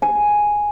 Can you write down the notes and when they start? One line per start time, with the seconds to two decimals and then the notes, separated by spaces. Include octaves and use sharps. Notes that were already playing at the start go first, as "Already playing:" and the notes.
0.02 G#5